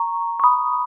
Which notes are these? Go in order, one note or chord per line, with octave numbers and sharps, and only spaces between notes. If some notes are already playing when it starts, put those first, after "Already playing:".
Already playing: A#5 C#6
C#6
B5 D#6